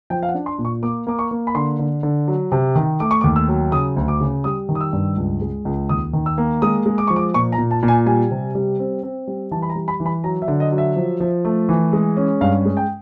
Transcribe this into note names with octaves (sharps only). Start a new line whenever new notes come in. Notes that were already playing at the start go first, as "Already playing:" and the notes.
F3 G5
F5
F#5
D4
C6
A#2
C#6
A#3 D6
A#3 D6
C#6
A#3
B5
D3 C6
D3
D3
F#3
C3
D#3
A3 D6
C#6
D6
D#2
E6
F#3
C#3 D#6
D2
D6
C#3
G3 D#6
D#3
D#6
E6
G2
C#2
G#3
C#2
D#2 D#6
D#3
E6
A#3
G#3 D#6
G#3
D6
F3 C#6
D6
A#2 C#6
A#5
A#2
A5
A#2
G#5
G3 G#5
C3
G3
C4
C4
G3
E3 A5
B5
A#5
G3
B5
E3
B5
F#3 A#5
E5
D3
D#5
F#3
E5
F3
F3
A3
E3
G#3
C#4
G2 F5
G#3
G5